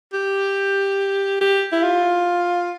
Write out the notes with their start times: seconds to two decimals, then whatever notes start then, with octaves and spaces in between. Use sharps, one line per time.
0.13 G4
1.41 G4
1.72 E4
1.83 F4